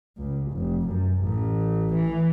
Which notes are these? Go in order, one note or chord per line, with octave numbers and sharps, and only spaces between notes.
C#2
F1
F#2
A1
E3